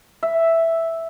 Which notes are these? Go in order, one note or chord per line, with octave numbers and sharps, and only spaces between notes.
E5